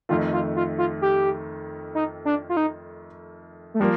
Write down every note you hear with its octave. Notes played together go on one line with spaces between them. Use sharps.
F2 D#3 A3 F4
F4
F4
F4
G4
D#4
D4
F4
D#4
A3
F3 G3 A#3